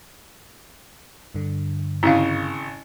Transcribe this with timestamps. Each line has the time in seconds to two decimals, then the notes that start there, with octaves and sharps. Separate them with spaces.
1.34 G2 D3
2.03 G#1 C#3 E4 F5